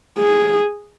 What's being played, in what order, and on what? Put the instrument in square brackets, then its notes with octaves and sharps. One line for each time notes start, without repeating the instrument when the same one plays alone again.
[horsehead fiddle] G#4